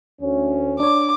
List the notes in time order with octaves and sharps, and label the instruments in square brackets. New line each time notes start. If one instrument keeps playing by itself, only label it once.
[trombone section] D2 C#4
[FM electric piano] D4 C#5 [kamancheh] D6